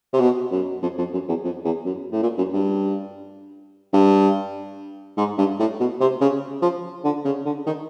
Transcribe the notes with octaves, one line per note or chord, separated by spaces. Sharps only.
C3
B2
F#2
F2
F2
F#2
E2
F2
E2
F#2
A2
A#2
F#2
G2
G2
G#2
G2
A2
B2
C3
C#3
F3
D3
C#3
D3
D#3